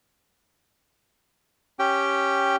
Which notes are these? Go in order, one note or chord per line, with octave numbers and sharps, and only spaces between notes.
C#4 G4 G5